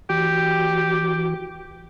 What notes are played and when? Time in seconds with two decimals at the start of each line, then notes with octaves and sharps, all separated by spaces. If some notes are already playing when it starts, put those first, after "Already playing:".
0.10 E3 F#4 G4